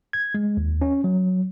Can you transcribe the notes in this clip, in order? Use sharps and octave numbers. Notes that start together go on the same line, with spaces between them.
G#6
G#3
D#2
C#4
F#3